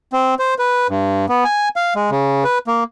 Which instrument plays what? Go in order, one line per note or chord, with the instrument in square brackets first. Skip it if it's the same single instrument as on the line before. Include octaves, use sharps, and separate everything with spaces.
[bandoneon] C4
C5
B4
G2
B3
G#5
F5
G#3
C#3
B4
A#3